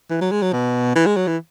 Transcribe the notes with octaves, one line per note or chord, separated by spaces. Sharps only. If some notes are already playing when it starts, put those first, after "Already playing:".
E3
F#3
G#3
F#3
B2
E3
G#3
F#3
E3